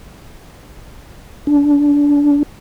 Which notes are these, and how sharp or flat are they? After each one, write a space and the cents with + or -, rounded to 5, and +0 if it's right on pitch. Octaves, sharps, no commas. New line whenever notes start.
D4 -25